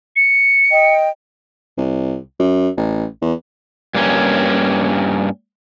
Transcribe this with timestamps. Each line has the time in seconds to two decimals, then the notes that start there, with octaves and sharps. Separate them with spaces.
0.16 C#7
0.71 D#5 G5
1.78 C2
2.39 F#2
2.77 A1
3.21 E2
3.94 G2 A#3 C#4